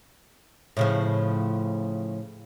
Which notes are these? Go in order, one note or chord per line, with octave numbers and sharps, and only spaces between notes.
A2 C#3 F3